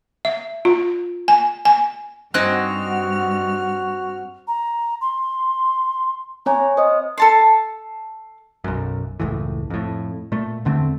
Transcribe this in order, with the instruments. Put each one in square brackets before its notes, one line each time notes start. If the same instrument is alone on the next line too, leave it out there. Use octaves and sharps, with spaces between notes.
[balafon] E5
F4
G#5
G#5
[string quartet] G2 F6 [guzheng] C4 G#5 [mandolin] D#4 F#6 [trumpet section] F#4
[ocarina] A#5
C6
[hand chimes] C4 C#5 G#5 [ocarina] A#5
[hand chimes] C5 D#5 [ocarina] D#6
[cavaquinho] A4 A5 C6
[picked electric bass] B1 F#2
F#1 C#2 A2 E3
F2 A2
A#2 A3
E2 D3 A3 C4